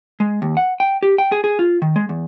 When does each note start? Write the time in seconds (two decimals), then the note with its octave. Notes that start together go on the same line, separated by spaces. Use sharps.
0.20 G#3
0.42 D#2
0.57 F#5
0.80 G5
1.03 G4
1.18 G5
1.32 G#4
1.44 G#4
1.59 F4
1.82 D#3
1.96 G#3
2.09 E2